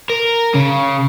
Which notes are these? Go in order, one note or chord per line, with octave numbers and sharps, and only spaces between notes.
A#4
C#3